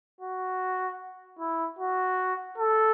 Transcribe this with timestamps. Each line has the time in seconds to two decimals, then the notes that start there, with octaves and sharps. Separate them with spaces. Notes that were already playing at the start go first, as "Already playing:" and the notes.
0.21 F#4
1.39 E4
1.79 F#4
2.58 A4